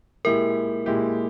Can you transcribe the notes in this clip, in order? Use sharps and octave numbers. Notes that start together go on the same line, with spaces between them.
A#2 G#3 E4 G4 A#4
A#2 G#3 E4 G4